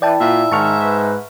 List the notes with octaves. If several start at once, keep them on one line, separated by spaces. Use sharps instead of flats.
E3 E4 D5 G5 A5
A#2 E5
G#2 D#3 A5 C#6 F6
B4